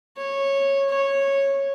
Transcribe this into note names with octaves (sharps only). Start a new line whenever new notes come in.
C#5
C#5